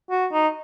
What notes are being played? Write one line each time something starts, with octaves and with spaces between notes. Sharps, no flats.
F#4
D#4